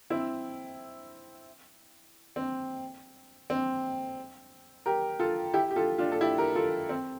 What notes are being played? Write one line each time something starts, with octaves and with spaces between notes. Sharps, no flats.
C4 E4
C4
C4
G4 A#4
F4 A4
E4 G4
G4
F4 A4
D4 F4
A4
E4 G4
G4 A#4
F4 A4
C4